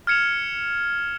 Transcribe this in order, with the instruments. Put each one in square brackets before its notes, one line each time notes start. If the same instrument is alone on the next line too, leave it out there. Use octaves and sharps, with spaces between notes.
[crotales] F6 G#6 C#7 E7 F7